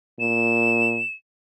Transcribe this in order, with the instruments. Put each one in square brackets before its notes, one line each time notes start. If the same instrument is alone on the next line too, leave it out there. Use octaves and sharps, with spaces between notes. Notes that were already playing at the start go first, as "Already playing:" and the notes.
[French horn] A#2 [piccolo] E7